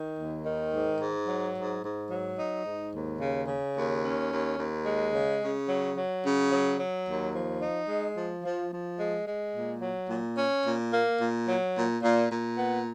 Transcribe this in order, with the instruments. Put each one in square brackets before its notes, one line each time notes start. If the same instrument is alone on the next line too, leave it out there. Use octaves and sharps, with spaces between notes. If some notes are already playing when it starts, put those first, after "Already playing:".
Already playing: [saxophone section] D#3
D#2
D#3
G#2
G#2
F#3
G#2
G#2
F#3
D#4
G#2
D#2
C#3
C#3
D#2
C#4
D#2
D#2
G#3
C#3
C#3
F#3
F#3
C#3
F#3
F#3
D#2
F3
D#4
G#3
F3
F3
F3
G#3
G#3
A#2
F#3
A#2
C#4
A#2
A#3
A#2
F#3
A#2
A#2
A#2
B3